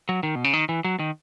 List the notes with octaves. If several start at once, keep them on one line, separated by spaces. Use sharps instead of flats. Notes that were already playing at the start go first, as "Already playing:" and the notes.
F#3
D#3
B2
C#3
D#3
E3
F#3
D#3